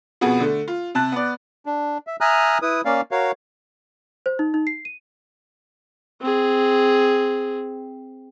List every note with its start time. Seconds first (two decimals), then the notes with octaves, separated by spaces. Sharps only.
0.21 F2 B2 B3 F#4 G#4
0.40 D3 A3
0.68 F4
0.95 C3 A5 F#6
1.12 B3 D5
1.66 D4
2.07 E5
2.21 E5 G#5 A#5 D#6 F6 F#6
2.62 E4 B4 D#6
2.85 A#3 C#4 D5 F5
3.11 F#4 A#4 C#5 F5
4.26 C5
4.39 D#4
4.54 D#4
4.67 C7
4.85 D#7
6.21 C4 G#4